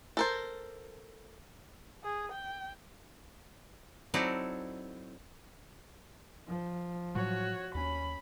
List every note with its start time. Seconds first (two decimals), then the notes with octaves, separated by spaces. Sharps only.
0.17 A4 A#4 C5
2.03 G#4
2.32 G5
4.14 F#3 C4 D#4 E4 A4 D5
6.47 F3
7.15 A2 F#3 G3 F#4 C#5
7.75 D#2 C#4 B5